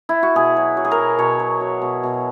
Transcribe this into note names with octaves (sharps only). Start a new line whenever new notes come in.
E4
F#4
B2 G#4
F#3
F#3
G#4
A#4
B2
B2 C#5
F#3
F#3
B2
B2